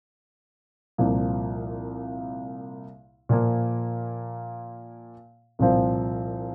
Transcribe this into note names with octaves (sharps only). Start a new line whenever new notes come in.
C2 A#2 F3 A#3
A#2 F3 A#3
C2 A#2 F3 C4